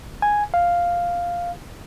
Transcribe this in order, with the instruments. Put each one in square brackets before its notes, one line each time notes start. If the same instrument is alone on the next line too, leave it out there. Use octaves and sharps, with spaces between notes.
[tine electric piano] G#5
F5